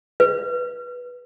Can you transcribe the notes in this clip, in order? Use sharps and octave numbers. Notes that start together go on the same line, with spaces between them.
B4